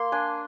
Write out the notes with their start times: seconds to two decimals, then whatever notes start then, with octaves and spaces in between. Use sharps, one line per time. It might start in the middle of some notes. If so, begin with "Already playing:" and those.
Already playing: A#3 C6
0.12 D4 G#5